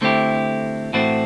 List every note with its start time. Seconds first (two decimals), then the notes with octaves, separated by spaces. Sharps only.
0.01 D3 A3 C4 E4 G4
0.93 A2 E3 A3 C4 F#4